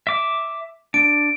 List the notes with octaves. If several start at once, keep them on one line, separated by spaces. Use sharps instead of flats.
E5 D6
D4 D7